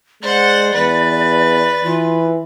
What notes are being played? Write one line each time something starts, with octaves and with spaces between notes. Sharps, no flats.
G#3 C5 D5 F#5
E2 B4
E3 F4